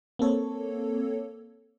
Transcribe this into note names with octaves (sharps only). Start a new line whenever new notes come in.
A#3 C4 A4 C#5